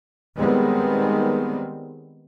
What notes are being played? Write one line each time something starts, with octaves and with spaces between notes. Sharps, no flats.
D#3 G3 G#3 B3 C4